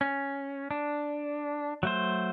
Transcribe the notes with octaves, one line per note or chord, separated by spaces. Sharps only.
C#4
D4
F#3 A3 C5